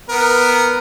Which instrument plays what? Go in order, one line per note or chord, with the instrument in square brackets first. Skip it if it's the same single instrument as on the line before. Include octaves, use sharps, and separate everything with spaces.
[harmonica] B3 A#4